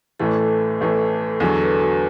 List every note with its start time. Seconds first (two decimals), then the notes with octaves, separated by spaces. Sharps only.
0.20 A1 A2 E3 A3 A4
0.81 A1 A2 E3 A3
1.40 E2 D3 F#3 A4
1.61 B4
1.81 F#4